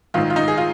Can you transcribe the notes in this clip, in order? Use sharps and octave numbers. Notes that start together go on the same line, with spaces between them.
A#1 G#2 D#3 F4
F4
D#4
G#4
F4